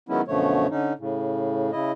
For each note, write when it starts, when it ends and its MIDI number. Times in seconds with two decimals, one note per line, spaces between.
0.09 0.21 51
0.09 0.21 54
0.09 0.21 56
0.09 0.21 59
0.09 0.21 61
0.09 0.21 64
0.28 0.67 42
0.28 0.67 47
0.28 0.67 50
0.28 0.67 53
0.28 0.67 57
0.28 0.67 73
0.71 0.93 50
0.71 0.93 61
0.71 0.93 63
0.99 1.72 45
0.99 1.72 49
1.72 1.92 49
1.72 1.92 64
1.72 1.92 75